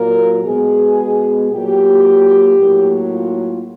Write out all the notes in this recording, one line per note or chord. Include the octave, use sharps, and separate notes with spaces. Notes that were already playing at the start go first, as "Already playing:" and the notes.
Already playing: A#2 F#3 A#3 A#4
B2 G#3 B3 G#4
A#2 F#3 A#3 G4
A2 F#3 A#3
F4